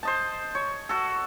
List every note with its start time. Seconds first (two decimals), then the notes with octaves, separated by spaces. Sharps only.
0.03 C5 D#5 A5
0.55 C#5
0.89 F#4 A4